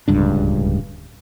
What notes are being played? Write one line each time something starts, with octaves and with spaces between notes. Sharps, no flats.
D1 C#2 G2 D4